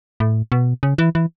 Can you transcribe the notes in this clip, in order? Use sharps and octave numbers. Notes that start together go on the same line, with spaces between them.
A2
B2
C#3
E3
E3